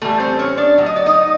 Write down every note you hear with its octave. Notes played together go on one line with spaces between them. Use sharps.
A2 E3 G3 A3 A4
C4 C5
C#4 C#5
D4 D5
A2 F#3
D#5
D5
D#4 D#5